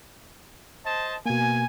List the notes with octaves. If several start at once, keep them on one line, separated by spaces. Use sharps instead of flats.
C5 D#5 A5
B2 A#3 G#5